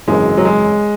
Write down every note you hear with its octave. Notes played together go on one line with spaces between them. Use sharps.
G#1 F#2 C#3 E3 G#3
F#3
G#3